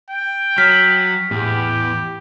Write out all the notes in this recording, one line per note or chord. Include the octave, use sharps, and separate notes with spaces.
G5
F#3 F6 B6
E2 A2 G4